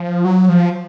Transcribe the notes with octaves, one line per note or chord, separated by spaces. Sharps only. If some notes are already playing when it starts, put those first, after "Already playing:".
Already playing: F3
F#3
F3